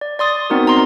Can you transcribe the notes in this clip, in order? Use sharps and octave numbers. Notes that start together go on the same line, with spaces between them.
D5
D5 C6 D#6 A6
B3 C4 D#4 F#4 A#4
A#5 C6